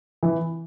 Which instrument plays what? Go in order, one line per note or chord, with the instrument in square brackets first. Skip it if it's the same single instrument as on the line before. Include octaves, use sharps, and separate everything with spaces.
[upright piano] E3